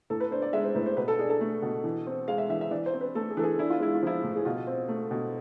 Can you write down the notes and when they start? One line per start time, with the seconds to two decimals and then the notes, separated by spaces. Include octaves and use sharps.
0.10 A2 A4
0.20 B4
0.31 D4 C5
0.42 D5
0.53 G#3 E5
0.64 C5
0.75 A2 B4
0.86 C5
0.97 B2 B4
1.08 A4
1.19 D4 G#4
1.30 A4
1.41 A3
1.62 B2
1.84 E3
2.07 C4
2.28 G#3 F5
2.38 E5
2.49 E3 E5
2.61 E5
2.71 E3 D5
2.86 C5
2.94 C4
3.01 B4
3.15 A3 A4
3.30 G#4
3.37 E3 A4
3.43 G#4
3.58 D4 E4
3.70 F4
3.80 G#3 E4
3.94 F4
4.03 F3 E4
4.23 A2
4.36 G#4
4.45 B2 F4
4.67 C4
4.89 A3
5.11 B2